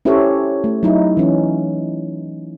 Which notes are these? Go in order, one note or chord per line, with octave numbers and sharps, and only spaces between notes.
C#4 E4 G4 A4 C5 C#5
A3
F#3 D#4 E4
E3 C#4